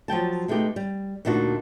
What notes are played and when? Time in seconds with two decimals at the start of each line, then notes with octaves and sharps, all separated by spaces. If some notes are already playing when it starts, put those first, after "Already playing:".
0.08 F3 F#3 G5 A5
0.48 B2 G#3 A3 D#4 G4
0.76 G3
1.25 D2 A#2 D4 D#4 F4 F#4